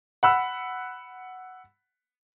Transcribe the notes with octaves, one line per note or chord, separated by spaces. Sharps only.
F#5 B5 E6